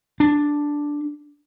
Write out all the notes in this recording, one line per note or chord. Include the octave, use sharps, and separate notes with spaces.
D4